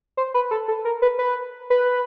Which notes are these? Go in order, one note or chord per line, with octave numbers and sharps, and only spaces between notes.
C5
B4
A4
A4
A#4
B4
B4
B4